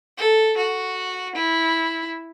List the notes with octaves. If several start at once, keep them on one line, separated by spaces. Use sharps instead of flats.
A4
F#4
E4